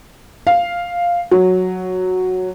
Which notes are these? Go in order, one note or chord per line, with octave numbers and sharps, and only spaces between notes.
F5
F#3